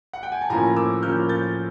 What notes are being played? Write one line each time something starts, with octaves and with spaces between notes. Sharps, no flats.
F#5
G5
G#5
A5
A2 F3 A#3 C#4 G#5 A#5
D6 E6
A2 F3 A#3 C#4 F6 G6
G6 A6